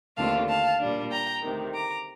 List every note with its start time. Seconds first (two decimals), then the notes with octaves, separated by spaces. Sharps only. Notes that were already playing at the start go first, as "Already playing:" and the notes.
0.16 D#2 D3 A3 C4 F4 F5 A5
0.49 F5 A5
0.79 A#2 G3 D4
1.11 G5 A#5
1.42 D2 C3 D#3
1.74 A#5 D6